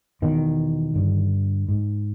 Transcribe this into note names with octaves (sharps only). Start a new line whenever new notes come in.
E2 B2 D#3
G2 D3
G#2